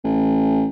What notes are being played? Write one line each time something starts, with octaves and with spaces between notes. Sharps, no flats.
A1